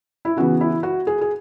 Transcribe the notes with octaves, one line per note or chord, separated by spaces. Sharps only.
E4
C#3 E3 B3 F#4
E4
F#4
G#4
G#4